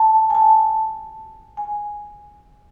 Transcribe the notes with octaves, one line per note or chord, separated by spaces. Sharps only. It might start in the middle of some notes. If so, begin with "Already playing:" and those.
Already playing: A5
G#5
A5
G#5